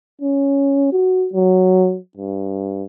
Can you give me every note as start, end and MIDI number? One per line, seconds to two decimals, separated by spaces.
0.21 0.89 61
0.92 1.28 66
1.33 1.97 54
2.17 2.85 43